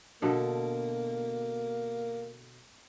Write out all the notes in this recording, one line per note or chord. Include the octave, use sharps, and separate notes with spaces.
B2 D3 A#3 A4